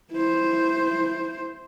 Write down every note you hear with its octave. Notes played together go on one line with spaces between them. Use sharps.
E4 C5